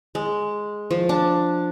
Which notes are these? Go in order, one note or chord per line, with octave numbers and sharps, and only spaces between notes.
G#3
F3
D4